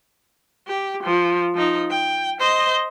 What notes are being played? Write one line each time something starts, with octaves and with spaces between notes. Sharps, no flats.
G4
F3
F3 D#4
G5
C5 D#5